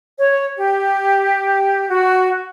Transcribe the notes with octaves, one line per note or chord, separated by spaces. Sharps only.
C#5
G4
F#4